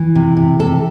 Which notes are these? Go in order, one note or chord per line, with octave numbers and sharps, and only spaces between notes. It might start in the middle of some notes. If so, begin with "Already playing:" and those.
Already playing: E3
C3
C3
C3 A4